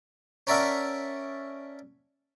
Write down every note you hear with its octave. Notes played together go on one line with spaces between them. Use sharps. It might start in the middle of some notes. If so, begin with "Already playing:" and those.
C#4 A#4 D5 E5 F#5 A5